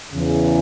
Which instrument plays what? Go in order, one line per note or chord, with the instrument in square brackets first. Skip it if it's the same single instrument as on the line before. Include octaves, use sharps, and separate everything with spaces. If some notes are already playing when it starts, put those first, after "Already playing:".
[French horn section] E2 C#3 E3